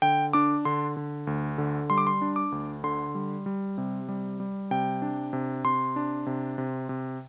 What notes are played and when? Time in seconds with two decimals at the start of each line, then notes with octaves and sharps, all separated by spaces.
0.02 D3 G5
0.33 D4 D6
0.65 D3 C6
0.97 D3
1.27 D2
1.58 D3
1.90 G3 C6
1.98 D6
2.07 C6
2.22 D4
2.36 D6
2.52 D2
2.84 D3 C6
3.15 G3
3.46 G3
3.78 C3
4.09 G3
4.40 G3
4.71 C3 G5
5.02 D4
5.33 C3
5.64 C3 C6
5.96 D4
6.26 C3
6.58 C3
6.89 C3